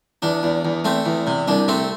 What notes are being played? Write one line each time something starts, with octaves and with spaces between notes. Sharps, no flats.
E2 D4
E2
E2
A3 C4
E2
C3
C2 D4
A3 C4